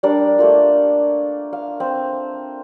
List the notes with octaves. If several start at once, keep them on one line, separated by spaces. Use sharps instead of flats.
G3 D4 A#4 D5
A3 A#3 F4
F5
C4